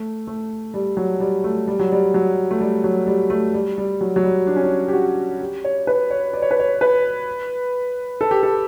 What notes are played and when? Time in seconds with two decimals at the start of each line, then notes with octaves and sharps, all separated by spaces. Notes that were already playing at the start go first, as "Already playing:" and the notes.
Already playing: A3
0.27 A3
0.74 G3
0.97 F#3
1.20 G3
1.44 A3
1.68 G3
1.79 F#3
1.92 G3
2.14 F#3
2.51 A3
2.61 G3
2.84 F#3
3.07 G3
3.30 A3
3.54 G3
3.78 G3
4.01 F#3
4.16 F#3
4.23 G3
4.47 D4
4.56 C#4
4.64 D4
4.88 G4
4.93 F#4
5.41 G4
5.64 C#5
5.87 B4
6.10 C#5
6.33 D5
6.42 C#5
6.51 B4
6.59 C#5
6.81 B4
8.21 A4
8.31 G4
8.43 A4